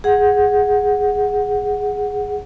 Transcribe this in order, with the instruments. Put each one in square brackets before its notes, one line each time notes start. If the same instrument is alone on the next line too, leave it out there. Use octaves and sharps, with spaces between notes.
[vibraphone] G#4 F#5